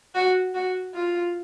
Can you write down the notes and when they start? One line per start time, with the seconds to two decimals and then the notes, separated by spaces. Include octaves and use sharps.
0.15 F#4
0.54 F#4
0.94 F4